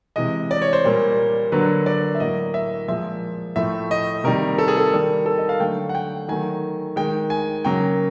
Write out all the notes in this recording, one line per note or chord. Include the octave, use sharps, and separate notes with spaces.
C3 E3 G#3 D#5
D5
C#5
C5
A#2 G3 A#3
D3 F#3 A#3 B4
D5
E5
A2 F#3 A#3 D#5
E5
A#2 F3 G#3 E5
A2 F3 A3 E5
D#5
C3 D#3 G3 A#3 A#4
A4
G#4
A4
D#3 G3 A#3
A4
D#5
F5
D3 F#3 A3 G5
F#5
G5
D#3 F#3 A3 G#5
D#3 G#3 G5
G#5
C#3 F#3 A#3 G5